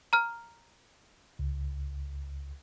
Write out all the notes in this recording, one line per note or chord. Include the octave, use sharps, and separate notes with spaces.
A#5 F6
C#2